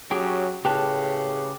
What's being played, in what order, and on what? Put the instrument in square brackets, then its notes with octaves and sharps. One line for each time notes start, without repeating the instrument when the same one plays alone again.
[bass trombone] F#3 [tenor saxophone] C#4 [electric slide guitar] G4 G#4 G5
[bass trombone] A2 [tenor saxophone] C#3 [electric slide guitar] G4 B4 A5 [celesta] G5